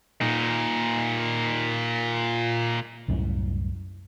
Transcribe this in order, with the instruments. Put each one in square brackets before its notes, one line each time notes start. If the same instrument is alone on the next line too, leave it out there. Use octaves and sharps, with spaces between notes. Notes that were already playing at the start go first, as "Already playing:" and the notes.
[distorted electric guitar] A#2 D#4
[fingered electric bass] C2 F#2 A2